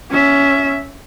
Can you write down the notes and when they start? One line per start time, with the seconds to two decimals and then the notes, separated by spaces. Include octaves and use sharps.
0.10 C#4 E5